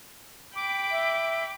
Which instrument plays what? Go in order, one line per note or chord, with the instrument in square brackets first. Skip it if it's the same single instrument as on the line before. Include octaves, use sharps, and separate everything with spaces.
[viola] G5 B5 [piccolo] D6
[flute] E5